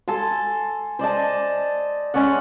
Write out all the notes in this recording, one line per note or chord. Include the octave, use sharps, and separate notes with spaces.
A4 G#5 A5 C6
C5 D5 D#5 A5
G#3 C#4 D5 F#5